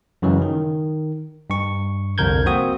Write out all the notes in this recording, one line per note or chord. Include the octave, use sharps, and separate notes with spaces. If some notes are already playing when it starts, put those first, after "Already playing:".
F#2 C#3 E3 F#3 G#3
D#3
G2 C#6
C2 F2 D3 A#4 G6 G#6
A#3 C4 F#4 D#6